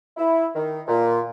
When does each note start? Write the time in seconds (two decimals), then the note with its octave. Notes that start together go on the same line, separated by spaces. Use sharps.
0.17 E4
0.56 D#3
0.88 A#2